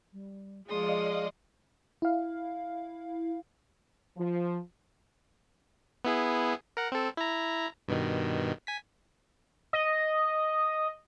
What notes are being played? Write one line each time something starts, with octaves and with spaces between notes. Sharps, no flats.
G3
F3 G#3 G#4 D5 D#5 F5 C6 D#6
E4 F5
F3
B3 E4 G#4
A#4 F#5
C4 A4
E4 A#5
G2 B2 D#3
G#5 B6
D#5